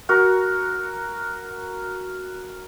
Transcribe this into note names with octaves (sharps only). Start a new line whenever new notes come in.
F#4 A#4